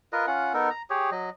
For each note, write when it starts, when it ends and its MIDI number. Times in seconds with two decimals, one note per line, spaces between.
0.13 0.26 65
0.13 0.26 70
0.13 0.26 71
0.13 0.26 75
0.27 0.53 61
0.27 0.53 65
0.27 0.53 78
0.54 0.69 59
0.54 0.69 63
0.54 0.69 69
0.54 0.69 70
0.70 0.82 82
0.90 1.10 67
0.90 1.10 68
0.90 1.10 73
1.12 1.30 54
1.12 1.30 75